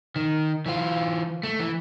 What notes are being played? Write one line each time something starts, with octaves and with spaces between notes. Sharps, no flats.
D#3
E3 F4
A3
E3